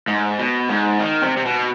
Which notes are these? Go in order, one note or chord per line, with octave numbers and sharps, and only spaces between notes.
G#2
B2
G#2
D#3
C3
C3
B2